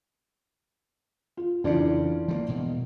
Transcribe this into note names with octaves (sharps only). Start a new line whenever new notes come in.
F4
F2 C#3 E3 D4 F4
F3 G3 A#3
E1 B2